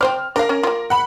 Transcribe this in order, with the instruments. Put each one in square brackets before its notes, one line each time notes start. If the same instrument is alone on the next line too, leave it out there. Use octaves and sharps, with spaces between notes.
[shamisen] C4 C5 D5 [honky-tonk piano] F6
[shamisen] D4 F5 [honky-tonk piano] A#4
[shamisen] C#4
A#3 F4
[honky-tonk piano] F#5 B5